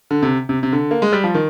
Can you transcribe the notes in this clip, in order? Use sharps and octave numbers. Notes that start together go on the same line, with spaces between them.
D3
C3
C3
C3
D3
A#3
G#3
G3
F3
D#3